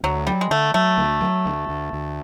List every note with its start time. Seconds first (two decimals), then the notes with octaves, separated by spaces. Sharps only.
0.03 D2 F#3
0.27 F#3 G3
0.41 G#3
0.51 D3 A3
0.74 F#3 A3
0.98 D2
1.21 F#3
1.45 D2
1.69 D2
1.93 D2